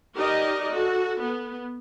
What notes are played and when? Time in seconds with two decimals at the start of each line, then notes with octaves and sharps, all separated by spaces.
0.16 D#4 G4 A#4 D5 D#5
0.70 F#4 A4
1.21 B3